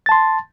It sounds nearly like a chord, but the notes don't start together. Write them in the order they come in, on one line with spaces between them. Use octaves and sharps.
A6 A5 C6